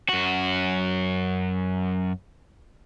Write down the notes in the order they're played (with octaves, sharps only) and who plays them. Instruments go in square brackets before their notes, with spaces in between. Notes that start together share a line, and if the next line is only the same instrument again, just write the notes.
[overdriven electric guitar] F#2 F#4